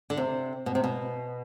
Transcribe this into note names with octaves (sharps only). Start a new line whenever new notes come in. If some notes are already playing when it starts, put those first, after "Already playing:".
D3
C3
B2
C3
B2